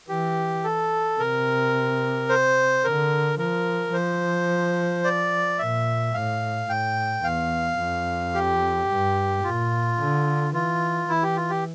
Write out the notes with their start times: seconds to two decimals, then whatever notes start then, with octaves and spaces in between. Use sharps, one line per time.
0.08 E3 G4
0.64 A4
1.19 C3 A#4
2.29 C5
2.84 D3 A#4
3.39 F3 A#4
3.93 F3 C5
5.04 D5
5.59 A#2 E5
6.14 A2 F5
6.69 A2 G5
7.24 E2 F5
7.79 F2
8.34 G4
8.88 G2
9.44 A#2 F4
10.00 D3
10.54 E3 F4
11.08 E3 E4
11.23 G4
11.37 F4
11.50 G4